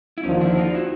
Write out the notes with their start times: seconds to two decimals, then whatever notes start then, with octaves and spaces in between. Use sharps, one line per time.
0.18 E4
0.23 D#2 D3 F3 C#4 D#4
0.41 D4 E4
0.58 D#4 F4
0.75 E4 F#4